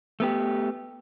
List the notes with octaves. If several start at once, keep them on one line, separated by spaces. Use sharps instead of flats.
A3 B3 G4